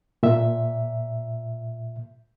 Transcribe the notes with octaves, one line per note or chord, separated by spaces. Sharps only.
A#2 E5